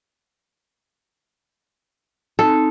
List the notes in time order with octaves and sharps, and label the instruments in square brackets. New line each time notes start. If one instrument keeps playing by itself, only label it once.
[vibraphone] C4 D#4 [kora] A4